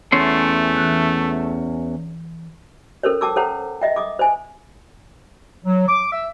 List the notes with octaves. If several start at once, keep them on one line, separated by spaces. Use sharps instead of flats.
E2 A3 C#4 C6
E3 F#6
C#4 A4 A#4 C5 C#5
G5 A5 D6 E6
A4 C5 C#5 F#5 G5 A#5
D#5 E5 G5
D6 D#6
C5 G#5
F#3
D6
E5